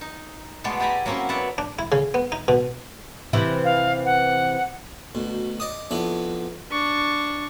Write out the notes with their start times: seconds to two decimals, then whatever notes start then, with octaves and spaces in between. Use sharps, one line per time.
0.01 D#4
0.64 B2 G#3 A3 B3 D5
0.80 E4 G4 D5 G#5 A#5 B5
1.06 F#3 A#3 C4 C#4 E4
1.29 B3 C#5 D5 E5 F#5
1.58 D4
1.79 E4
1.92 C#3
2.14 B3
2.32 D#4
2.48 B2
3.33 C3 E3 E4
3.64 F5
4.05 F#5
5.15 D2 B2
5.60 D5 D#5 D#6
5.91 F2 B3 D4 E4
6.71 D4 C#6